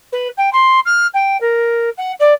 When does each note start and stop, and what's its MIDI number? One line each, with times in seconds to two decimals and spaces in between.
0.12 0.28 71
0.37 0.52 79
0.52 0.80 84
0.85 1.07 89
1.14 1.39 79
1.40 1.89 70
1.97 2.12 78
2.20 2.33 74